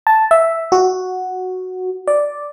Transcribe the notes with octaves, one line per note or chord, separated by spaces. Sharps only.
A5
E5
F#4
D5